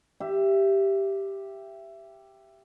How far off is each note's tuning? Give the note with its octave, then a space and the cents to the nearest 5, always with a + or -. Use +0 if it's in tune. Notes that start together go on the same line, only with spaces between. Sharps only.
G4 +0 E5 +20